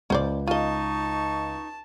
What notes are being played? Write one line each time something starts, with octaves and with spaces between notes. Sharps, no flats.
C#2 C#4 C5 D5
D#4 F4 D#5 A5 C#6